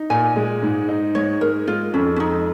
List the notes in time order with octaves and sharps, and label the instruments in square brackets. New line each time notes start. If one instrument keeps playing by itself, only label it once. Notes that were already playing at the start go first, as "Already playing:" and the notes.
Already playing: [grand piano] D#4
[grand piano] A#2 [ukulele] G#5
[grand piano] G#3
G#2
D#4
[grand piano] G#2 [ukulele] C#5
[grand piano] G#3 [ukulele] A#4
[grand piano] G#3 [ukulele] F4
[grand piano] F2 [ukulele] C#4
[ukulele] C#4
[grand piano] F2 [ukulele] D#4